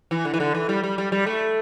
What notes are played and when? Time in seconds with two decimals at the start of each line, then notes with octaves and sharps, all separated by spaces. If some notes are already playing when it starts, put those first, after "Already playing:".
0.11 E3
0.25 D3
0.34 E3
0.40 D3
0.55 E3
0.69 G3
0.83 G3
0.98 G3
1.12 G3
1.26 A3